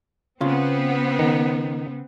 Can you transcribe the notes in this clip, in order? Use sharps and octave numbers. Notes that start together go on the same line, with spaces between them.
C#3 B3 C4 F4
D#3